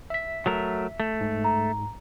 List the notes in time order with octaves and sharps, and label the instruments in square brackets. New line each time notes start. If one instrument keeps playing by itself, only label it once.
[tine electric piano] E5 B6
[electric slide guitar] F#3 A3 A#4
A3
[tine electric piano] G#2
[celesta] A#5